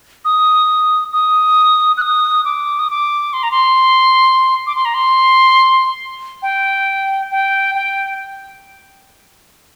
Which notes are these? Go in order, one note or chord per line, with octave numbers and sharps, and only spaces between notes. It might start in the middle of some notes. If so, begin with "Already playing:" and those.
D#6
D#6
F#6
D#6
D6
D#6
D6
C6
A#5
C6
D6
C6
A#5
C6
G5
G5
G5